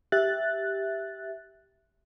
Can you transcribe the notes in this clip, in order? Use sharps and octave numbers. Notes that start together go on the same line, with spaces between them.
G4 E5 F#6 A6